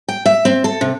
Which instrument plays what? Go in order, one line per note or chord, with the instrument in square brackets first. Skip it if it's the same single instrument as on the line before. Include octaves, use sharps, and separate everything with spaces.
[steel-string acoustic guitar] G5
E5
C4
A4
C3